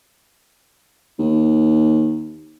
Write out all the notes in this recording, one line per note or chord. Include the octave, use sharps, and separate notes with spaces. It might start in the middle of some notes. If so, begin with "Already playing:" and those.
D#2